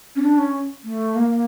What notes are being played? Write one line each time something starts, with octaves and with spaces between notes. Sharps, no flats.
C#4
D4
C#4
A3
A#3